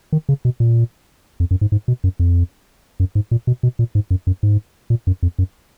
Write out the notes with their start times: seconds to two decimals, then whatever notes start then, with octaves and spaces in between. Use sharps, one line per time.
0.13 D#3
0.29 C#3
0.45 B2
0.60 A#2
1.40 F2
1.51 F#2
1.61 G#2
1.72 G#2
1.88 B2
2.04 F#2
2.20 F2
3.00 F#2
3.15 G#2
3.31 A#2
3.47 B2
3.63 B2
3.79 A#2
3.95 G#2
4.11 F#2
4.27 F#2
4.43 G#2
4.90 A#2
5.07 F#2
5.23 F2
5.39 F#2